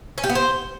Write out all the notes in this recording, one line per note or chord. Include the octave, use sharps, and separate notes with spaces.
C#4
G4
B3
C5